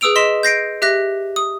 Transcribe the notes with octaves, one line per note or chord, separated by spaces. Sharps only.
G#4 B4 D#6 E6 D7 F7
D#5 C6 B6 E7
G6 A#6 C7 D7
G4 E5 F#6 A#6
D#6